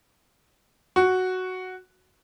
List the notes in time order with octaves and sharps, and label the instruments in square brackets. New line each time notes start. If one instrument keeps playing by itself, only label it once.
[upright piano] F#4